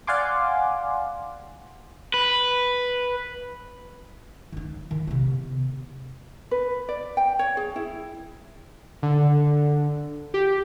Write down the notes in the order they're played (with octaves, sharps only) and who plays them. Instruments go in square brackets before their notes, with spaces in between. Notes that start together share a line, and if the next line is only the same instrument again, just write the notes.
[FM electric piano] D5 F5 F#5 G#5 C6 D6
[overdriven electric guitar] B4
[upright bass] D#3 D#4
D#3
C3 B3
[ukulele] B4
D5
G5
C#5
G#4
E4
[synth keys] D3
G4